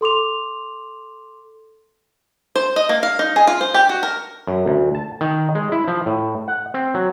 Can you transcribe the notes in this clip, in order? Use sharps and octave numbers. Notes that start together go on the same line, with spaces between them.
A4 C6 D6 F7
C5
D#5
A#3
F5
D#4
G#4
F4
C5
G4
F#4
A#4
F#2
D2
A5
D#3
G#3
E4
F3
A2
F#5
C4
F#3